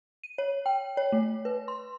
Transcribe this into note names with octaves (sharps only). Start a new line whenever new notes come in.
D#7
C#5
G5
C#5
A3
B4
C6